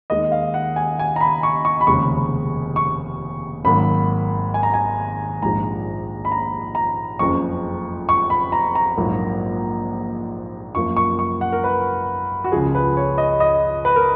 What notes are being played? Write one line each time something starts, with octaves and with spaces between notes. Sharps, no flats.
D#2 D#3 G#3 D#5
F5
F#5
G#5
G#5
A#5
B5
C#6
C#6
B5
F1 D#2 C#3 G#3 C#6
C#6
G#1 G#2 F#3 A#3 B5
G#5
A#5
G#5
A#1 G#2 F3 G#3 A#5
B5
A#5
A#5
F#1 F2 C#3 C#6
C#6
B5
A#5
A#5
A#1 G#2 F#3 A#3
F#2 F3 A#3 C#6
C#6
C#6
F#5
A#4
B4
F#4
C#2 C#3 F3 G#4
B4
C#5
D#5
D#5
B4
A#4